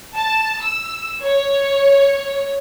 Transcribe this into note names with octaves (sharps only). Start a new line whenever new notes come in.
A5
E6
C#5